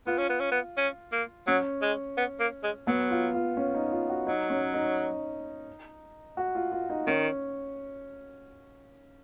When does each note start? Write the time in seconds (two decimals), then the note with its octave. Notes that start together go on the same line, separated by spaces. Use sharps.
0.07 B3 F4
0.18 C#4
0.29 B3
0.40 C#4
0.52 B3
0.78 C#4
1.12 A#3
1.47 F#3 C#4
1.82 G#3
2.17 B3
2.40 A#3
2.63 G#3
2.87 F#3 B3
3.11 F4
3.34 F4
3.57 C#4
3.75 D#4
3.92 F4
4.10 F#4
4.27 F#3 D#4
4.50 C#4
4.74 D#4
6.37 F#4
6.55 F4
6.72 F4
6.90 D#4
7.07 D#3 C#4